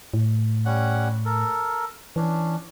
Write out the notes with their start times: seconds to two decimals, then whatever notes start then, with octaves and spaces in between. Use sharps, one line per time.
0.14 A2
0.66 G3 C#4 F#5
1.25 A4 A#4
2.16 E3 C#4 D4